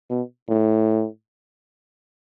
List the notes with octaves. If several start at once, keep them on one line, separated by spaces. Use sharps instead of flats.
B2
A2